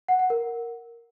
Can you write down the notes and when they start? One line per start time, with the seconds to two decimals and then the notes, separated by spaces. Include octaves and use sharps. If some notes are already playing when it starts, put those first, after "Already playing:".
0.08 F#5
0.19 F#5
0.30 A#4